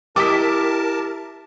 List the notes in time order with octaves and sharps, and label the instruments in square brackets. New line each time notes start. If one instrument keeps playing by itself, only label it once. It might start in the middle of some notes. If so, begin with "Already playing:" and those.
[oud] E4 G4 D#5 [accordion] A#4 A5 [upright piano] D6 B6